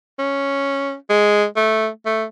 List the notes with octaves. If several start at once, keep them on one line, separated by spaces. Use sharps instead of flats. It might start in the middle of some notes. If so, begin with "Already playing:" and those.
C#4
G#3
A3
A3